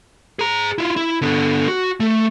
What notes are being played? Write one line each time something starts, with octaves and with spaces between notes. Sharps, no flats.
G#4 A#5
E4 F4
E4
D3 B3
F#4
A3